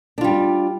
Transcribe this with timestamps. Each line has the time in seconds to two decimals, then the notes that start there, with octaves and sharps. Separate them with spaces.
0.18 D4
0.21 F4
0.24 G3